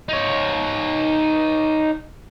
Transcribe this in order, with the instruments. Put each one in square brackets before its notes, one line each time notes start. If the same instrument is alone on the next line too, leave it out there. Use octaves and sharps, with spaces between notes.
[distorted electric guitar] D#4 C#5